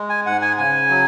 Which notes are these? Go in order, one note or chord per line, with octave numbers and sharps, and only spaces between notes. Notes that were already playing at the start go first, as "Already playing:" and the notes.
Already playing: G#3
G#5
G#2 F#5
G#5
C#3 G#5
F#3